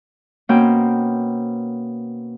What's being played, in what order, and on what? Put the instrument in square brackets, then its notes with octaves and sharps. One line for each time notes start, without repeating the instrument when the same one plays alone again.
[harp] B2 A#3 C4 C#4 G5